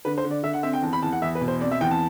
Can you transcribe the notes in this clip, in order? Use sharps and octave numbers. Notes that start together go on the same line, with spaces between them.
D3 B4
C5
D3
D5
D3 E5
F#5
C4 E5
G5
E2 A5
B5
E2 A5
F#5
E2 E5
B4
B2
C5
C4 D5
E5
E2 G5
A5